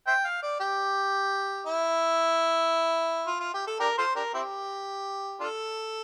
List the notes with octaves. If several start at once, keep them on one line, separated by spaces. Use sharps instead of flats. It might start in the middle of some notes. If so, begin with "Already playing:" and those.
C5 E5 G5
F5
D5
G4
E4
F4
F4
G4
A4
D4 G4 A#4
F4 A4 C5
D4 G4 A#4
C4 E4 G4
D4 F4 A4